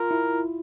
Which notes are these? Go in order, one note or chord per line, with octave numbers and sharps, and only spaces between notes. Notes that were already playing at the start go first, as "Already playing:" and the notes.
Already playing: F4 A#4
E4